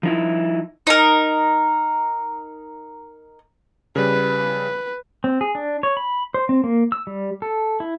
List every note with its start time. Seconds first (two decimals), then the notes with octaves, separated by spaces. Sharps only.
0.03 F3 D#4 E4
0.87 D#4 A#4
3.96 C#3 G3 B4
5.24 C4
5.41 G#4
5.55 D4
5.83 C#5
5.97 B5
6.34 C5
6.49 C4
6.64 A#3
6.92 E6
7.07 G3
7.42 A4
7.80 E4